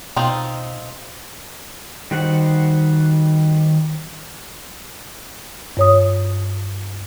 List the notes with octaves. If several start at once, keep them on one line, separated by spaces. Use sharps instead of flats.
B2 C4 D#4 F4
D#3 G3 F#4 C5 F#5
G2 C#5 D#6